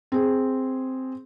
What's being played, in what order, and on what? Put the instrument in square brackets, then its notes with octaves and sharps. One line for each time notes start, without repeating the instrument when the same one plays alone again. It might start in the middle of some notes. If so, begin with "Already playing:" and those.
[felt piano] C4 G#4